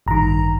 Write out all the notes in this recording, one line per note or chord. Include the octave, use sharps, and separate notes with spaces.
A1 G2 D#3 A#5